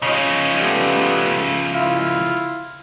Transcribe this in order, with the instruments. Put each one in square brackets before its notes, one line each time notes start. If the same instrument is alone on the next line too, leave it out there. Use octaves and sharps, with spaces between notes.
[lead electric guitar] C#3 F3 [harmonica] C#5 D#5
[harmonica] G3 A3 B3
E4 F4 F5